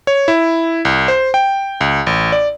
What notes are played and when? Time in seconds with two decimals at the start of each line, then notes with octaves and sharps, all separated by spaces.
0.07 C#5
0.28 E4
0.85 C2
1.08 C5
1.34 G5
1.81 C#2
2.07 A1
2.32 D5